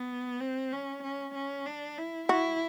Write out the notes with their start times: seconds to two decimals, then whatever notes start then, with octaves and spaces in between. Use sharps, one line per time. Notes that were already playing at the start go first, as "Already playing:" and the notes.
Already playing: B3
0.40 C4
0.72 C#4
1.03 C#4
1.35 C#4
1.66 D4
1.98 E4
2.29 E4 F#4